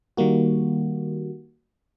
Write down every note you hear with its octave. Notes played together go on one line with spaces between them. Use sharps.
D#3 G3 A#3 F#4